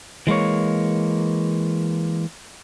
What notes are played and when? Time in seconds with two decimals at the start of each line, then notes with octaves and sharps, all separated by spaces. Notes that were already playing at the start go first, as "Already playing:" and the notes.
0.27 E3 G#3 A#3 C#5